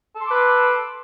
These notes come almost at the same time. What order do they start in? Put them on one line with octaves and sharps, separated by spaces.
A4 C6 D6 B4